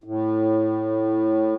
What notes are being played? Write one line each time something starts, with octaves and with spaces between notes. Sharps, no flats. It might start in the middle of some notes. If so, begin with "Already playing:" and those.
A2